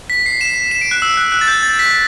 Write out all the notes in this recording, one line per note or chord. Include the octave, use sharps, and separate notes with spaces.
B6
C7
E7
E7
D7
F#6
E6
F#6
F#6
A6
G6
A6
B6